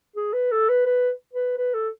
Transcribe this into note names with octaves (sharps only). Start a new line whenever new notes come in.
G#4
B4
A4
B4
B4
B4
B4
A4